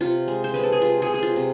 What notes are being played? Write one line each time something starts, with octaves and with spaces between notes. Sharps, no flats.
C3 F4
G#3
C5
G#3 B4
A4
G#4
C3 F4
G#4
C3
G#4
F4
C3